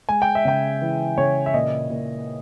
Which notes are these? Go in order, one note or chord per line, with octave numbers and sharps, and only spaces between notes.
G#3 G#5
G5
E5
C#3 G5
E3
C#3 C#5
E5
A#2 D#5
A#2